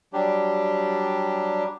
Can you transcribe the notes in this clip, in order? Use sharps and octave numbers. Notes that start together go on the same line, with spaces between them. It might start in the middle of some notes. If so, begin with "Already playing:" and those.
F#3 G3 D4 G4